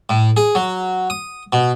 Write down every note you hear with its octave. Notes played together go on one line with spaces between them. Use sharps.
A2
G#4
F#3
D#6
B2